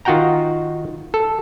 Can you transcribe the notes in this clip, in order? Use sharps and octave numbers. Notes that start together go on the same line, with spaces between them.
D#3 F4 F#4 F#5 G5 A#5
A4